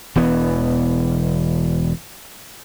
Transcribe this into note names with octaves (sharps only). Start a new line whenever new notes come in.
E1 E3 B3